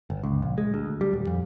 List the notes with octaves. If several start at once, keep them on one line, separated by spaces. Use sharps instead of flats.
G1
C#2
A#1
G#3
D2
G3
D#1
F2